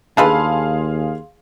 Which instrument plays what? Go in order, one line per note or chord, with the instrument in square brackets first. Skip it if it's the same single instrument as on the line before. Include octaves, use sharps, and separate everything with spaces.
[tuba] D#2 [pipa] D4 A4 B4 [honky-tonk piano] G#4 F5 C6